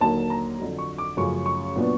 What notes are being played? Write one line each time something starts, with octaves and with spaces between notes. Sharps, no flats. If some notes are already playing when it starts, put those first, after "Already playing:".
D#2 D3 F#3 A#3 A5
A#5
F2 D3 F#3
C#6
D6
F#2 C#3 F3 A3 C#4 C#6
C#6
A#2 F#3 B3 D4